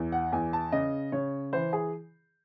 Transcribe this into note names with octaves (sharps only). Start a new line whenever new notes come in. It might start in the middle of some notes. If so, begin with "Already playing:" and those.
Already playing: E2
F#5
E2 G#5
A5
C#3 D#5
C#3 C#5
E3 C5
G#4